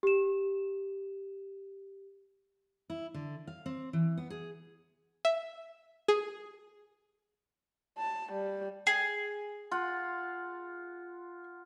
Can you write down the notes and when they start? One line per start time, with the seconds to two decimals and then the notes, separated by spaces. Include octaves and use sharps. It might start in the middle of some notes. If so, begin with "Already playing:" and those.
0.03 G4 E7
2.90 E4
3.14 D3
3.47 F5
3.66 C4
3.93 E3
4.17 B3
4.30 G#4
5.25 E5
6.08 G#4
7.98 A5
8.32 G3
8.87 G#4
9.71 F4 F#5